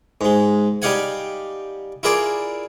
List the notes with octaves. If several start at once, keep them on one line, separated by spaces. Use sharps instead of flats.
G#2 G#3
G3 D#4 G4 F5 F#5 G#5
E4 F4 G#4 A#4 D5